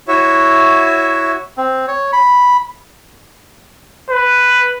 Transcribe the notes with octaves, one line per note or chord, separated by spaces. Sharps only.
E4 F#4 C#5 E5
C4
C#5
B5
B4